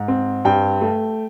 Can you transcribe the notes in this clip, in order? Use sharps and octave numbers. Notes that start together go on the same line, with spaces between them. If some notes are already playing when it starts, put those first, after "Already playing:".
Already playing: G#2
C4
G2 G5
A3